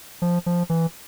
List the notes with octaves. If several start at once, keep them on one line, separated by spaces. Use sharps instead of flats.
F3
F3
E3